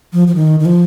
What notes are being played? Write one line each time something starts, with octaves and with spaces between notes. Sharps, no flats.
F3
F3
D#3
D#3
F3